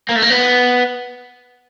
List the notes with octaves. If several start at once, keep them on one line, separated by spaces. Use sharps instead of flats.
A#3
A3
A#3
B3